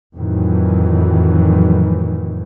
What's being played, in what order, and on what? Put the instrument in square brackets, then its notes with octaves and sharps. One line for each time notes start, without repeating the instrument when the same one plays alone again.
[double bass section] F2 A2 D#3 E3 F#3